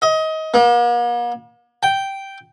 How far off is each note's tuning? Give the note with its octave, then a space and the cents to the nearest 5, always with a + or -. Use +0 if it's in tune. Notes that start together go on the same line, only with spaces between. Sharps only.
D#5 +25
A#3 +45
G5 -5